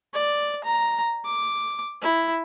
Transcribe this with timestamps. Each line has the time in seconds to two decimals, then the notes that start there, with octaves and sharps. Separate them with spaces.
0.14 D5
0.64 A#5
1.25 D6
2.02 E4